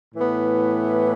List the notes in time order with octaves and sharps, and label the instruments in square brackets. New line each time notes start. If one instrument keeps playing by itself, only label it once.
[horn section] A2 E3 B3